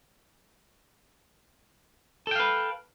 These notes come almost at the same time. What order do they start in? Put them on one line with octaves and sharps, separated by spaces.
A4 G5 F5 B4